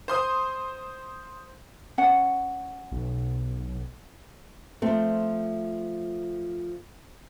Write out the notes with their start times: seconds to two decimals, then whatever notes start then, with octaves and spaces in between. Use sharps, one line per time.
0.08 C5 C6 D#6
1.98 C#4 F#5
2.92 B1
4.82 F3 A3 C4